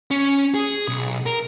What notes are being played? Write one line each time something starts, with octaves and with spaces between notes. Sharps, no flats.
C#4
G#4
B1
A#4